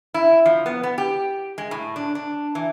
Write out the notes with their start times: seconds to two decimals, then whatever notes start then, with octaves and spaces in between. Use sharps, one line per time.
0.14 E4
0.46 F3
0.66 B3
0.83 B3
0.98 G4
1.58 G#3
1.71 A2
1.96 D4
2.15 D4
2.55 E3